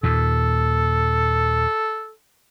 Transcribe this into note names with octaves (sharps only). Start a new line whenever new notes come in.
D#2 A#2 A4